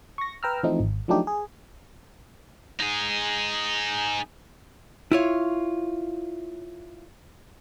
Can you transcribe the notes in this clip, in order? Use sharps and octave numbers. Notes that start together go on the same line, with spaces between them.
C#6 A#6
B4 G5 A#5 E6 F6
E3 F3 A3 C4 D#4
G#1
F3 F#3 A3 D4 D#4 G4
G#4
D#4 G#4
E4 F4 C#5